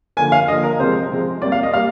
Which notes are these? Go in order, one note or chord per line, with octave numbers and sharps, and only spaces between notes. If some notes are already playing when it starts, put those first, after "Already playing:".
D3 F3 A#3 G#5
F5
D3 F3 A#3 D#5
A#4
C3 F3 G#3 C5
C3 F3 G#3
C3 G3 A#3 D5
F5
D#5
G3 A#3 F5